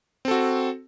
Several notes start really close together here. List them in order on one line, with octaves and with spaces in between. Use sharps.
C4 A4 F#4